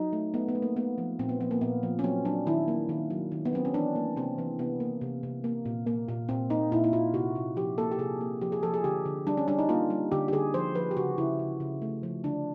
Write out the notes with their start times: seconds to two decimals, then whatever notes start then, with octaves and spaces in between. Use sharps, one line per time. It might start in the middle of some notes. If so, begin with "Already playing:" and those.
Already playing: F#3 D#4
0.13 A3
0.34 A3 B3
0.49 B3
0.55 A3
0.62 A#3
0.76 A3 B3
0.98 F3
1.19 A#2 C4
1.29 B3
1.40 F3 B3
1.51 A#3
1.61 A#2 B3
1.83 F3
1.99 C#4
2.04 F#3 C4
2.25 F#3 D4
2.46 D#3 E4
2.68 A#3
2.89 D#3
3.10 F#3
3.32 D#3
3.45 B3
3.53 F#3 C4
3.65 C#4
3.74 E3 D4
3.95 A#3
4.16 C3 C4
4.38 E3
4.59 C3 B3
4.80 A#3
5.01 C3
5.23 C3
5.44 A#3
5.65 A#2
5.87 A#3
6.08 A#2
6.29 A#2 C4
6.50 A#3 D#4
6.72 A#2 E4
6.84 E4
6.93 A#2 F4
7.14 C3 F#4
7.35 C3
7.56 F3 G4
7.78 A#3 A4
7.92 G4
7.99 C3 G#4
8.21 A#3
8.41 F3 G4
8.52 G#4
8.63 F3 A4
8.74 G#4
8.84 D3 G4
9.05 D3
9.27 G3 D4
9.37 C#4
9.48 G3 D4
9.59 D#4
9.69 A#3 F4
9.90 G3
10.12 D3 G4
10.28 G4
10.33 D3 G#4
10.54 F3 C5
10.75 F3 B4
10.91 G4
10.97 C#3 F#4
11.18 C#3 E4
11.39 C#3
11.60 C#3
11.82 A3
12.03 F3
12.24 D3 D4